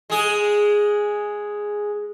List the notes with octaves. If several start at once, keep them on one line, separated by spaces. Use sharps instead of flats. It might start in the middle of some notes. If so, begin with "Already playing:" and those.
G#3 G#4